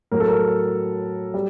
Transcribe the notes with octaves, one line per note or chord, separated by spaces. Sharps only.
A2 F#3 A#4
A4
A#4
G3